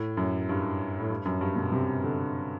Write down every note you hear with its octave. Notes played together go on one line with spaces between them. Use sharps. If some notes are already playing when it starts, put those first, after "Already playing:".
Already playing: A2
F#2
G2
A2
G2
F#2
G2
B2
C3
D3